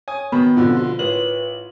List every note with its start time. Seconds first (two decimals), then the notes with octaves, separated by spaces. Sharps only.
0.08 C#5 G#5 D#6
0.32 D#3 B3 F#4
0.57 B2 D3 F3 C4 F4
0.77 F4 C6
0.99 A1 A#4 B4 C#5 F#7